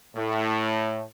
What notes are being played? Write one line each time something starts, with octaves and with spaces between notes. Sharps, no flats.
A2